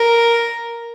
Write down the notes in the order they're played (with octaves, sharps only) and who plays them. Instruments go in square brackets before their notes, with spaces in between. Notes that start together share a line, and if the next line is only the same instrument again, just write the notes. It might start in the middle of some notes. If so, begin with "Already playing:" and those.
Already playing: [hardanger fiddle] A#4